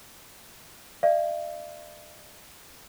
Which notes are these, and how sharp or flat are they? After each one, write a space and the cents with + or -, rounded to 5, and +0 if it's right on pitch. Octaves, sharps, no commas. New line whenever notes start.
D5 +45 F5 -45